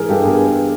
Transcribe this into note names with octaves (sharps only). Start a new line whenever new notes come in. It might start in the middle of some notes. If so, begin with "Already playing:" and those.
Already playing: E3 G#3 G#4 A#4
G2 G4 A4
B3 G#4 A#4